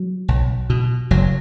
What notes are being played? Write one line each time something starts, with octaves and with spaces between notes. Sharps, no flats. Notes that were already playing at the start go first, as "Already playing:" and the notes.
Already playing: F#3
B1
B2
F#1 F#3